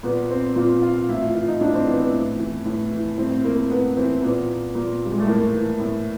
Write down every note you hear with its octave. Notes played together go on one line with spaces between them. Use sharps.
A#2 B3
C4
A#2 F4
F4
A2 E4
F4
E3 F4
D#4
A2 D4
C4
E3 B3
B3
A2
E3
A2
E3
A2 C4
C4
E3 A#3
A#3
A2 B3
E3 C4
A#2 B3
A#2
G3
G#3
A3
A2 A#3
E3
A2